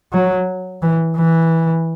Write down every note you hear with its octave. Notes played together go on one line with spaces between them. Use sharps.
F#3
E3
E3